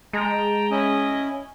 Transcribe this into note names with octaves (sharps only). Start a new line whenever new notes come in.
G#3 G5 A5 A#5
C#4 E4 D#5